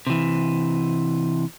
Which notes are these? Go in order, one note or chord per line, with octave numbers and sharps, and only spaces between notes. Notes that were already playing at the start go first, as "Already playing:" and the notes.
C3 E3